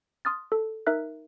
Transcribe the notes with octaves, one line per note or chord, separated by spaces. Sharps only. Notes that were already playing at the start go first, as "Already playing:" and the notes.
C6 D#6 F6 A6
A4
D#4 A#4 E5 F#6